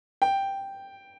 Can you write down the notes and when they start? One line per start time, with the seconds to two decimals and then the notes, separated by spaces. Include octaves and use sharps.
0.22 G5